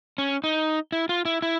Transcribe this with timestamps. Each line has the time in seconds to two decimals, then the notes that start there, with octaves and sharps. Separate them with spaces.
0.18 C#4
0.44 D#4
0.92 E4
1.09 F4
1.25 E4
1.42 E4